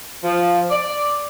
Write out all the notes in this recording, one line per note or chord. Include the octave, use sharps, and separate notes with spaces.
F3
D5